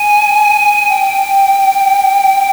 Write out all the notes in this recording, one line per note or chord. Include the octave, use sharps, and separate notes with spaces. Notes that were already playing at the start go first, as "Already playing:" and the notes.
Already playing: G#5
G5